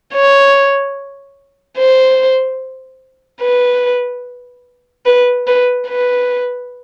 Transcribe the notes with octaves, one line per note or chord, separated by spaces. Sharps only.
C#5
C5
B4
B4
B4
B4